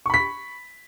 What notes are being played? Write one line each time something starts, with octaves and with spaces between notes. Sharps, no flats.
B5 C#6 B6